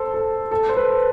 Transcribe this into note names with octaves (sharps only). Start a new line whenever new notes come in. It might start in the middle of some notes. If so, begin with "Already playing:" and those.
Already playing: A4 C5
A4
A4
C5
B4